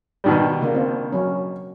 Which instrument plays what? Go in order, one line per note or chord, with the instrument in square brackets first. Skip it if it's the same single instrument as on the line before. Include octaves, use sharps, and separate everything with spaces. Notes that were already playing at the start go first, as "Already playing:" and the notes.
[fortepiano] B2 D#3 G3
[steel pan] C#3 A#3 D4
C4 D4 F4
F#3 C#4